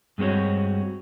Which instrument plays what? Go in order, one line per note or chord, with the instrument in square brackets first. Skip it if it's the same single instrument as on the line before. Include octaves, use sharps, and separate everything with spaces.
[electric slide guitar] G2 G#3 C4 F#4 C#5